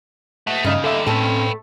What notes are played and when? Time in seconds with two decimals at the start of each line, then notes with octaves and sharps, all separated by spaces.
0.47 A3 D#5 F#5
0.65 G2 C#3 D#4 D#5 F5
0.84 G2 D3 A4 E5
1.07 A2 A3 C4 C#4 A4 B4 G5